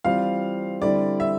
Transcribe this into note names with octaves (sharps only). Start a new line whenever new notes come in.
E3 G3 C4 F4 C5 F5
D3 G3 C4 E4 D5
E5